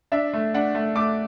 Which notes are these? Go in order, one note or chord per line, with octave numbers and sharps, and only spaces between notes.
D4 E5
A3
D4 F#5
A3
A3 D6